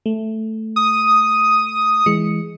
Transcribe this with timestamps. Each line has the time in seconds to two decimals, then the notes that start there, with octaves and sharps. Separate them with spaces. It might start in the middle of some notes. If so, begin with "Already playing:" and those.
0.06 A3
0.76 D#6
2.06 E3 G#3 C#7